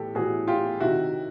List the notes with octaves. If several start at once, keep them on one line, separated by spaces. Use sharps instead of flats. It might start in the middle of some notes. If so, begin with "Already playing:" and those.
Already playing: A2 E3 G4 A4
A2 E3 F#4 G#4
F4 G4
C3 D#3 E4 F#4